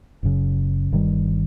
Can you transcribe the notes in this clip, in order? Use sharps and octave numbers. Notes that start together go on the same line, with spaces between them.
F#1 F#2 C#3
G1 G2 D#3 G3